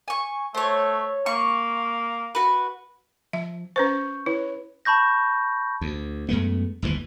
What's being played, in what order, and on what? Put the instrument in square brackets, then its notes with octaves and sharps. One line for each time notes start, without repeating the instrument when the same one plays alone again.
[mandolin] G#5 C#6
[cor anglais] A3 [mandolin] C5 C#5
[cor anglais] A#3 [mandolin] C#6
[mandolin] F#4 B4
[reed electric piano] F3 [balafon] E5
[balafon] C#4 B4 C5 [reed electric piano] C#6 G6
[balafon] E4 [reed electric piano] B4 C#5
[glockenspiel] A5 B5 C#6 G6 A#6
[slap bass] D2
F#2 G#3 A3 B3
G1 D#2 B2 E3